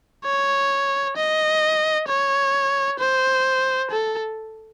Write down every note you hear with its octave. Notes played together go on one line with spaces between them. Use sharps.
C#5
D#5
C#5
C5
A4